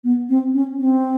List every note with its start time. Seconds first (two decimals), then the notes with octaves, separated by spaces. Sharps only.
0.04 B3
0.29 C4
0.54 C#4
0.79 C4